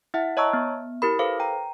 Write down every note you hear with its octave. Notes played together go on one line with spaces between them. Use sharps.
E4 E5 F#5
C#5 D#5 A5 A#5 C#6 E6
B3
E4 G4 A#4 B5
A4 B4 C5 F5
G5 A#5